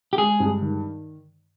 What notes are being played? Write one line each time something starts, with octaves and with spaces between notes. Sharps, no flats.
G4
G#3 G#4
G2
D#3